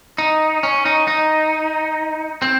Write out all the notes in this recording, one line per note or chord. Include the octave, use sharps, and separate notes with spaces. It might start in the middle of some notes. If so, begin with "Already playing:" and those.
D#4
C#4
D#4
D#4
C4